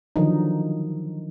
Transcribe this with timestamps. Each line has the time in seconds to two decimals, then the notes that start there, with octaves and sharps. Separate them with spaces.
0.16 D3 D#3 F3 F#3 D#4